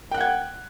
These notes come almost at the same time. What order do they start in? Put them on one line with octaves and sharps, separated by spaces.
G5 F#6 F#5 G#6